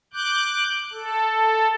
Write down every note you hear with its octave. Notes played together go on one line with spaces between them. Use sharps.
D6 F#6 G6
A4